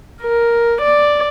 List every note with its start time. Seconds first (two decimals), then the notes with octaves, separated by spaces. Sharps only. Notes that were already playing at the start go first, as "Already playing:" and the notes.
0.22 A#4
0.82 D5